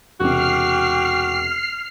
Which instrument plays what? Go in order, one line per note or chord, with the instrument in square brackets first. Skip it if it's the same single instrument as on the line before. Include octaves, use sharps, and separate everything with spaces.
[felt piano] E1 C3 [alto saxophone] F#4 [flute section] G5 D6 [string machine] F6 C7